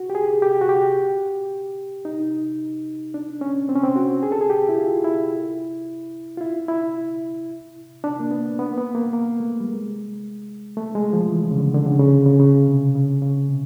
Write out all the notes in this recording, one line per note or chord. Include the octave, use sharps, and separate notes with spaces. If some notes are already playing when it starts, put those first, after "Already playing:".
Already playing: F#4
G4
G#4
G4
F#4
G4
D#4
D4
C#4
C4
C#4
C4
F#4
G#4
A4
G#4
G4
E4
F4
E4
F4
E4
E4
D4
A#3
B3
B3
A#3
B3
A#3
A#3
A3
G3
G#3
A3
G#3
F3
E3
C#3
D3
D3
C#3
C#3
D3
C#3
C#3
C3
C#3
C#3
C3